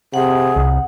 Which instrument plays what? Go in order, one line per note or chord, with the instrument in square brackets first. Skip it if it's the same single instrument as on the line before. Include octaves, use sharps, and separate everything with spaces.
[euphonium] C3 [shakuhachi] G#4 [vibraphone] F#5
[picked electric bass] C2